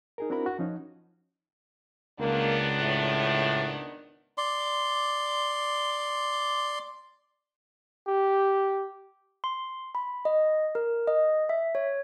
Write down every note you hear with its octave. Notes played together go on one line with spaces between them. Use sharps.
D#4 G#4 A#4
C4 D4 E4 F#4 A#4 B5
F#4
F3 C#4 D#4
C#2 D#3 A#3 B3 D4
A2
D5 C6
G4
C6
B5
D#5
A#4
D#5
E5
C#5